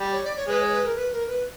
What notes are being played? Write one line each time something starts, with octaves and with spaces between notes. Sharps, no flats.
G3
C#5
D5
C#5
G#3 B4
C#5
B4
A#4
B4
A#4
B4